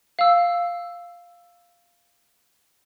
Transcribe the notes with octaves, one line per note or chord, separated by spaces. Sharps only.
F5 E6